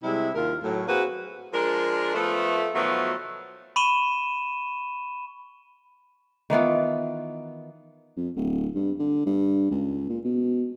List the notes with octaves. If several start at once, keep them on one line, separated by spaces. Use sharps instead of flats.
C3 G3 G#3 E4
D#2 F4 A#4
A2 F#3
A#3 C4 F#4 G#4 B4
F3 G#3 D4 A#4
F3 A3 B3
B2 D#3 F3 F#3 A3 B3
B5 C#6 D#7 E7 G7
D#3 E3 B3 F4
F2
D1
G2
D3
G2
C#2
A#2
B2